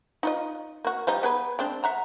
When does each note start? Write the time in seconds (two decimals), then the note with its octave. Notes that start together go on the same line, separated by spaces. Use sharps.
0.23 D#4 F4 D#5
0.85 A#3 F#4
1.07 F3 G3 D#4
1.23 B3 G#4 B4
1.59 G#3 C4 D4
1.84 E5 F#5 A#5